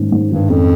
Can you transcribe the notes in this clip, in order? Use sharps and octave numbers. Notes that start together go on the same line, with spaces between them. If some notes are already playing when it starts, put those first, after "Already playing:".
Already playing: G#2 D#3 C#4
G#2
G2 D#3
F2 C#4